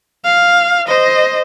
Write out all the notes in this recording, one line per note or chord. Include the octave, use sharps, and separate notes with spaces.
F5
C5 D#5